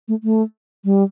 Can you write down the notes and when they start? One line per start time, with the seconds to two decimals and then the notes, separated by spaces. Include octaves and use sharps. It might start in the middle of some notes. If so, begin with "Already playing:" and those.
0.08 A3
0.24 A3
0.85 G3